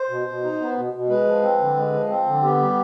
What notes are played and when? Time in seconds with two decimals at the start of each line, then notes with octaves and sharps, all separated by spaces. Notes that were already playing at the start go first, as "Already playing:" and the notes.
Already playing: C5
0.10 B2
0.27 B2
0.43 D#4
0.60 B3
0.77 B2
0.93 B2
1.09 G#3 B4
1.26 F3
1.42 C4
1.59 D3
1.76 G#3
1.93 F3
2.09 C4
2.26 D3
2.42 B3 G4
2.60 G3